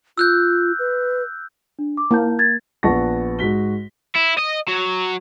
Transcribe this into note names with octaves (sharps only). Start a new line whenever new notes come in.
F4 E6 F#6 G6
B4
D4
D6
A#3 E4 A5 G6
G#6 A6
A#1 B3 F#5 A5 C#6 A#6
G#2 F#4 B6 G7
E4
D#5
F#3